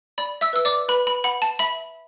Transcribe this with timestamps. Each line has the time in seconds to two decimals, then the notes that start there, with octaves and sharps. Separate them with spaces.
0.18 D5 B5
0.41 E5 E6
0.53 B4 E6
0.65 D5 D6
0.89 B4 B5
1.07 B5
1.24 F#5 B5
1.42 A5
1.59 E5 B5